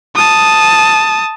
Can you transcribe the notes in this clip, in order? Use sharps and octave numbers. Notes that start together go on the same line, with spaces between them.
A5 D#6